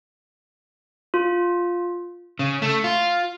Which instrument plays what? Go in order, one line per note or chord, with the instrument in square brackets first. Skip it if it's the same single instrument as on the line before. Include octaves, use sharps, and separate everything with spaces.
[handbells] F4
[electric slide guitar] C#3
A3
F4